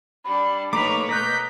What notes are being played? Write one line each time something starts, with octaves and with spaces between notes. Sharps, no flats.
G3 D4 B5
A3 A#3 D#4 B4 C#5 A#5 B5 D6
B2 A#4 D#5 F#6 G6 B6